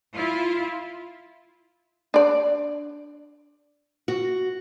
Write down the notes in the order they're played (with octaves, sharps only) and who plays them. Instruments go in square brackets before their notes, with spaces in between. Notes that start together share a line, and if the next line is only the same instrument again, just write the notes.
[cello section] E4 F4
[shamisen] D4 D5
[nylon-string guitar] F#4